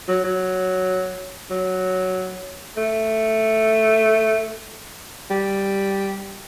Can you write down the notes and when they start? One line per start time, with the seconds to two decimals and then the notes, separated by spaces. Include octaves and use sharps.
0.08 F#3
0.24 F#3
1.51 F#3
2.77 A3
5.31 G3